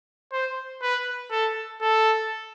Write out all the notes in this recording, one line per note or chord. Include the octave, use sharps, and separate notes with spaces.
C5
B4
A4
A4